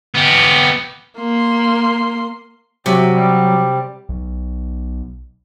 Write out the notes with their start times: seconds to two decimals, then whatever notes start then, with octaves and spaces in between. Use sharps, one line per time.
0.15 B3 G4
1.19 A#3 C6
2.86 C3 F#3 G5
3.15 G3
4.09 B1